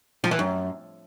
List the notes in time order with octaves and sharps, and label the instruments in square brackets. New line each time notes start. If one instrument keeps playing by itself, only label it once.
[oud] F3
E3
F#2